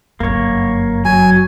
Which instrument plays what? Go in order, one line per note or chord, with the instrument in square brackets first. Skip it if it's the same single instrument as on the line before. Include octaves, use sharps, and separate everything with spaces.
[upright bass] G1 F#2 [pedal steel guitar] A#3 C#5
[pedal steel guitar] F#3 [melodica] G#5